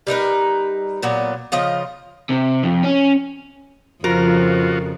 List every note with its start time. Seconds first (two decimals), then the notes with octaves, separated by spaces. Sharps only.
0.07 G3 D#4 A#4 B4
1.02 A#2 F#3 B3
1.52 C#3 F3 F4 D#5
2.29 C3
2.63 F2
2.83 C#4
4.04 F2 C#3 F3 F4 F#4 A#4